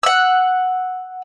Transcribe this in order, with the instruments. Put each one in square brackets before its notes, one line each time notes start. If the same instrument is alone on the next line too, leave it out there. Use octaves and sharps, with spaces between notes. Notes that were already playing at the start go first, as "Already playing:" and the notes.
[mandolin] F#5 E6